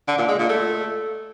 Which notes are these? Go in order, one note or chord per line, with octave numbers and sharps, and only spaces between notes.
D3
A#2
G#3
A#2
A3